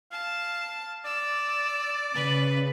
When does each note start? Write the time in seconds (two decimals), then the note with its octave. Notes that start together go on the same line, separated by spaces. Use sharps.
0.12 F5 A5
1.05 D5 E6
2.15 C#3 B4